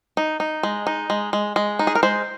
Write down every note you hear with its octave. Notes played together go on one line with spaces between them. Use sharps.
D#4
D#4
G#3
D#4
G#3
G#3
G#3
D#4
G#4
A#4
G#3 C5